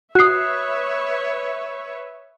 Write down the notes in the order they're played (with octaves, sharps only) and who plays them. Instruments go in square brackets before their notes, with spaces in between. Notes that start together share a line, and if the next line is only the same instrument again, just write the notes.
[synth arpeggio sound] F#4 C7 [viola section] B4 C#5 E5 [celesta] D#6 F#6